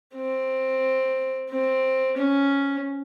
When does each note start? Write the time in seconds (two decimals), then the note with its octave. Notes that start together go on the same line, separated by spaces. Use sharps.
0.15 C4
1.50 C4
2.17 C#4